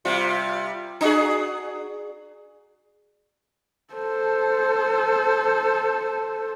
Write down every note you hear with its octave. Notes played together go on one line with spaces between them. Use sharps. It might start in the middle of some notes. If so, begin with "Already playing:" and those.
C3 G3 F4
D4 F#4 G#4
A4 C5